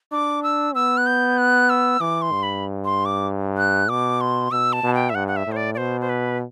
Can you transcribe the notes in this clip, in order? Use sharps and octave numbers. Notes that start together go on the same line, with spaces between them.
D4 D6
E6
B3 E6
F#6
G6
F#6
E6
E3 D6
C6
G2
B5
C6
D6
F#6
B2 D6
C6
B2 E6
A5
B2
G5
E5
G2 F#5
F#5
E5
A2
C5
D5
D5
B2 C5
C5
B4